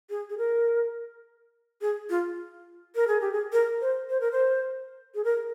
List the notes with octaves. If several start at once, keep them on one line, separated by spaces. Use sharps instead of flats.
G#4
G#4
A#4
G#4
F4
A#4
G#4
G4
G#4
A#4
C5
C5
A#4
C5
G#4
A#4